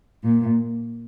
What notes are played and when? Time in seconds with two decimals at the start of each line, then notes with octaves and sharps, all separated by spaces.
0.24 A#2